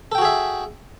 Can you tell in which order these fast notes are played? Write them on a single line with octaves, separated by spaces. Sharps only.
A4 G5 F#4 G#4 E5